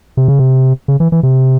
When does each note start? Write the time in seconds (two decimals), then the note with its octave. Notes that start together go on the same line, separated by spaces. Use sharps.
0.17 C3
0.28 C#3
0.39 C3
0.88 C#3
1.00 E3
1.12 E3
1.23 C3